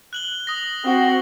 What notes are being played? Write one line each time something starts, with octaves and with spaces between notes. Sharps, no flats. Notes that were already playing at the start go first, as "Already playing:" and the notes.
F#6 F#7 G7
D#6 A#6
C4 F#4